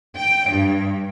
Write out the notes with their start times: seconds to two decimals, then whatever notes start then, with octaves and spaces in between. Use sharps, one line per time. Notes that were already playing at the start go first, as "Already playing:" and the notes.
0.16 G5
0.50 G2